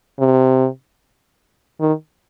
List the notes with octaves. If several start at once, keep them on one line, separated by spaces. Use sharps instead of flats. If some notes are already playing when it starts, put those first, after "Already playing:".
C3
D#3